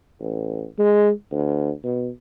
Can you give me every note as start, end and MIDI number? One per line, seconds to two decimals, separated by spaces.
0.20 0.64 33
0.79 1.11 56
1.32 1.71 38
1.84 2.09 47